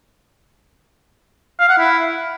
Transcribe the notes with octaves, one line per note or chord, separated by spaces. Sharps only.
F5
F#5
E4